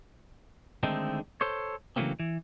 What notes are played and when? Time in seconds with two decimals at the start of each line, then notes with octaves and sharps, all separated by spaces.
0.83 D3 D#3 G#3 A3 C4 D#4
1.41 A4 C5 C#5
1.96 C#3 E3 F#3 A3 A#3 C4
2.20 E3